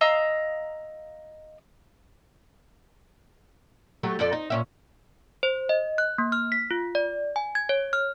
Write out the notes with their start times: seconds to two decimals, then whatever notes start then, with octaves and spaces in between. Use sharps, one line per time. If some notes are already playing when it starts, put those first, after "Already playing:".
0.01 D#5 F5 A#5 E6
4.03 F#3 A3 G4
4.19 F2 A4 D5
4.33 D#4
4.50 A#2 C#4 E5
5.43 C5
5.69 D#5
5.98 F#6
6.18 A#3
6.32 F6
6.52 B6
6.71 F4
6.95 D5
7.36 G#5
7.55 G#6
7.69 C#5
7.93 F6